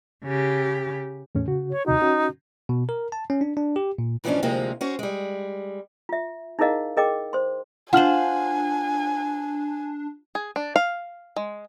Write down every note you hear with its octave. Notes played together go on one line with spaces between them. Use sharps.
C#3 G4
E2 A2 C#4
C#3 F#4
C#5
D#2 C3 D#4 F#4
C#4 F#4
B2
A#4
A5
C#4
D4
D4
G4
A#2
G#2 E3 F3 G3 C#4 D4
D2 C3 F3 G#3 A#3 C4
C#4 F#4 C5
G3 G#3
F4 E5
D#4 E4 G#4 A#4 D#5 F5
G#4 A#4 D#5 G5 D6
C5 C6
D4 F4 C5 F#5 G#5 F6 F#7
G#4
D4
F5
G#3